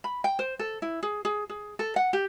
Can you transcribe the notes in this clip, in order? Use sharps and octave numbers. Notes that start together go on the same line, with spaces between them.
B5
G5
C5
A4
E4
G#4
G#4
G#4
A4
F#5
G4